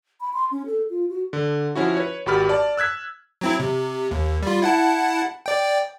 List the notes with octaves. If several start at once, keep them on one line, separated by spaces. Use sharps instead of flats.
B5
C6
C#4
A4
F4
F#4
D3
F3 C#4 E4 F#4
B4 C#5
G#1 F#4 G4 B5 F6 A6
D5 A5
E6 F#6 G#6 B6
F#3 C4 E4
C3
D#2
G3 F4
E4 F#5 A5
D5 G5